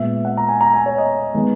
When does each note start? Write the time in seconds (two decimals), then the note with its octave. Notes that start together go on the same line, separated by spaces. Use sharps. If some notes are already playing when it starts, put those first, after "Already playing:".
Already playing: A#2 G#3 B3 E5
0.25 F#5
0.37 A#5
0.49 G#5
0.61 A#5
0.74 G#5
0.86 C#5
0.98 D#5
1.34 D#3 G#3 B3